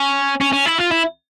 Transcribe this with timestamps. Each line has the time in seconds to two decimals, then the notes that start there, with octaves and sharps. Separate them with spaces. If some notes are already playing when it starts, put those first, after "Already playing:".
Already playing: C#4
0.41 C#4
0.53 C#4
0.66 E4
0.78 F4
0.91 E4